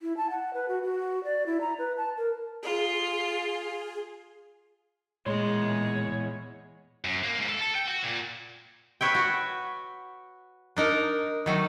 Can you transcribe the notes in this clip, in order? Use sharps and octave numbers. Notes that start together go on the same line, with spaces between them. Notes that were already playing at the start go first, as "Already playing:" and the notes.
E4
A5
F#5
B4
F#4
F#4
D5
E4
A#5
B4
A5
A#4
F4 G#4
E2 A#2 G#3 C#5 C6
F#2
A#3
G#2
A4
A4
G5
F#4
A#2
B4 C#5 E5 G5
F#4
D4 D#4 A#4
D#3 F#3 A3